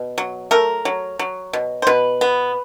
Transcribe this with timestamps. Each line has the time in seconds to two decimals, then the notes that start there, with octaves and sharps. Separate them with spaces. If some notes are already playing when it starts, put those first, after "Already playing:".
Already playing: B2
0.18 F#3
0.51 A3 A#4
0.85 F#3
1.19 F#3
1.53 B2
1.82 C5
1.87 B2 B4
2.21 B3